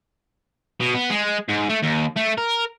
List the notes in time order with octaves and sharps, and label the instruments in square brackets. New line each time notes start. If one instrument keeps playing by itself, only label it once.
[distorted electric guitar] B2
B3
G#3
G#2
A3
D#2
A3
A#4